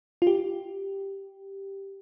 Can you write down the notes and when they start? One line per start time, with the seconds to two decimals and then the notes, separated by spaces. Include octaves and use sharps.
0.22 F4
0.27 G4